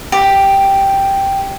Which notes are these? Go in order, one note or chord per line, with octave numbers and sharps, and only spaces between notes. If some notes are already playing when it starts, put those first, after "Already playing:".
G4